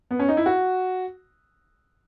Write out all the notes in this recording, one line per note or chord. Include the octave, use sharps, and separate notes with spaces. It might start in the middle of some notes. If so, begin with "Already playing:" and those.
B3
C#4
D#4
E4
F#4